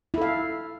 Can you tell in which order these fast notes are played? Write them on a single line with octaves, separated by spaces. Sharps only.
E4 A4 F5